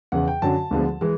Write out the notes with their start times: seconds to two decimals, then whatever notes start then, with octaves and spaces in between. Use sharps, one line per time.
0.12 E2 C#3 E3 F#5
0.28 G5
0.42 F#2 D3 F#3 A5
0.71 D2 D3 F3 G#3 B3
1.01 E3 G#3